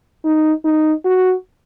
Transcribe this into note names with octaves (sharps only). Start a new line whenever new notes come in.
D#4
D#4
F#4